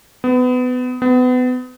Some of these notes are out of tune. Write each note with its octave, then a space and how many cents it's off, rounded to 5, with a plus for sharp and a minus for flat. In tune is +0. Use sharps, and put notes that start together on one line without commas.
B3 +25
B3 +30